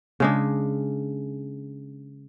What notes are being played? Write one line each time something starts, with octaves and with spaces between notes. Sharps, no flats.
C#3 G#3 D4